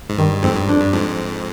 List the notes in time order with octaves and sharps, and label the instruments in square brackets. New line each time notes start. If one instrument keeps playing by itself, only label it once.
[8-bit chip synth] G#2
[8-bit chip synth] G2 [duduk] D#3
[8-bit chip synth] F2 G#2 [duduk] C4
[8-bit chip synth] G2
[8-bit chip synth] F2 [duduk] D4
[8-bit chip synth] G2
F2 G#2